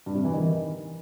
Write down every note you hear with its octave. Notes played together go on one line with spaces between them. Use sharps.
G2
C3
E3
D#3